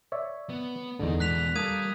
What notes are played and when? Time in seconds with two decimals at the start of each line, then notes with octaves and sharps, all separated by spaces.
0.12 C#5 D5 E5
0.49 B3
1.00 E2 G#2 D3 D#4
1.20 E3 G#3 F#6 B6 F7
1.56 G3 A#3 A4 D#6 G#6 D#7